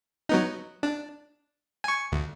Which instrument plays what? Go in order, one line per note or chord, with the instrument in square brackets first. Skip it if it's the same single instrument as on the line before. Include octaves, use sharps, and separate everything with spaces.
[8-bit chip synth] F#3 B3 D#4
D4
G#5 C#6
D2